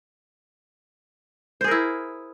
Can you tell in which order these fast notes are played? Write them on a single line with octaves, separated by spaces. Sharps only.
C5 G#4 A#4 E4